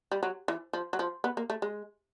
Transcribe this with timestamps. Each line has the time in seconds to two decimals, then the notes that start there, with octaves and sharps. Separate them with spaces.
0.12 G3
0.23 F#3
0.48 E3
0.73 F3
0.93 F#3
0.99 F3
1.24 B3
1.37 A#3
1.50 A3
1.62 G#3